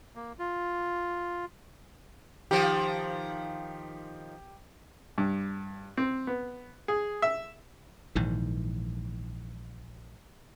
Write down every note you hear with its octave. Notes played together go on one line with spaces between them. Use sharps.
A#3
F4
D#3 F3 G4
G2
C4
B3
G#4
E5
A#1 G#2 D#3 E3